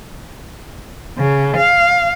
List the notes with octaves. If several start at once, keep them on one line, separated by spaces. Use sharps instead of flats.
C#3
F5